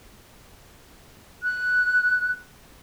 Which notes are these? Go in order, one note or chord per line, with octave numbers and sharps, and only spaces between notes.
F#6